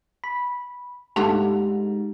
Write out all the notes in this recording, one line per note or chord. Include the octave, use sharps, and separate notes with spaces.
B5
G#2 D3 A3 F4 G4 F7